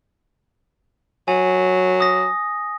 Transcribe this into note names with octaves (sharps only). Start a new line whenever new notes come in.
F#3 G#5
D#6 A#6